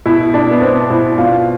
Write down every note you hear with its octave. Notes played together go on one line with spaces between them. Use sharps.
B2 E4
B2 D4
B3
B2 C4
B2 E4
B2 F4